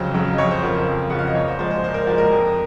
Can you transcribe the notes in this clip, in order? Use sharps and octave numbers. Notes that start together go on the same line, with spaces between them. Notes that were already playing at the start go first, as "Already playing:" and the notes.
Already playing: F2 C#3 F#3 C5
C#3 F#3
D#5
F2 C#5
C5
C#3 F3 A#4
C5
F2
C#3 F3 F#5
F5
D#5
A#2 C#5
C5
F3 G#3 C5
C5
A#2 C5
A#4
F3 G#3
A#4
F2